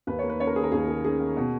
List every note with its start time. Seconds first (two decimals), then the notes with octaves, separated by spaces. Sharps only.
0.07 D#2 B4
0.19 A#3 C#5
0.30 B4
0.40 C#4 C#5
0.47 A#4
0.56 D#3 G#4
0.63 A#4
0.72 D#2 G#4
0.88 A#3 G#4
1.04 C#4 G#4
1.20 D#3
1.37 B2